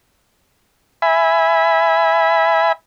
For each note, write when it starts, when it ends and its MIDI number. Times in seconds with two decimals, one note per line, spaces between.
1.02 2.72 76
1.02 2.72 80
1.02 2.72 83